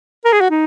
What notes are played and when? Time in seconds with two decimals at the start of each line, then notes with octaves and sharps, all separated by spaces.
0.25 A#4
0.32 G#4
0.41 F#4
0.50 D#4